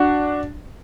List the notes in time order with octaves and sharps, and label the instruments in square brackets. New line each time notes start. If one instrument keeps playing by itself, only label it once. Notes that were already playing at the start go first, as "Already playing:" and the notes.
Already playing: [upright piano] D4 F#4